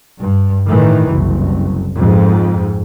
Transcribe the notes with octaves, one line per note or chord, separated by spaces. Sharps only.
G2
A2 D#3 E3
F#1 C2
F2 G#2